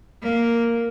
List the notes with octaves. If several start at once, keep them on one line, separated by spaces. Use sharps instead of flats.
A#3